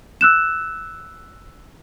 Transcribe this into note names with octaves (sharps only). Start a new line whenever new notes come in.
E6 F#6 E7